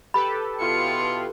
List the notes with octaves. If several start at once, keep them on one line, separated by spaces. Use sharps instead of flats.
G4 A4 B4 B5
B2 E4 F4 C#7